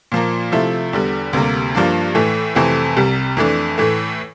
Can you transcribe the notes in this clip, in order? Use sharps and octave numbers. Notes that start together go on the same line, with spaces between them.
A#2 F3 A#3
C3 F3 A3 E4
E2 D3 G3
D2 C3 G3 A#3
G2 F3 A#3 D4
A2 E3 A3
F2 C3 E3 A3 C4
C2 C3 G3
F2 E3 A3 D4
A2 E3 A3